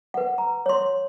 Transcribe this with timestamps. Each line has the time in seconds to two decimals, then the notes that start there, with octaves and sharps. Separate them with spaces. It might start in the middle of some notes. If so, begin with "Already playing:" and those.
0.14 B4 F#5
0.38 A#5
0.66 C#5 C6